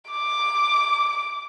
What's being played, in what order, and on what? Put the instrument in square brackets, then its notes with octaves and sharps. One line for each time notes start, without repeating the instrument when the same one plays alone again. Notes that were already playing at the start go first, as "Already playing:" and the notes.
[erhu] D6